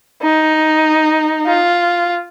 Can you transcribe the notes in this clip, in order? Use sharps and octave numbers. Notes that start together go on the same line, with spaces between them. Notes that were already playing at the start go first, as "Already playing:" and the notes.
D#4
F4